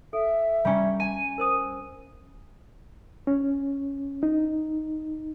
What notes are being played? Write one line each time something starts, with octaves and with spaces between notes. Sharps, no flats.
A4 E5
G3 C#4 A#5 C#6
G#5 D#7
A#4 C5 D#6
C#4
D#4